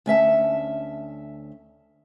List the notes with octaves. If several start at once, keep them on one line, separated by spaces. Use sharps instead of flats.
D2 C#4 E5 A5